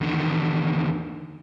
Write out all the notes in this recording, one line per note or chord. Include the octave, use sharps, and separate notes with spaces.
E2 D3 D#3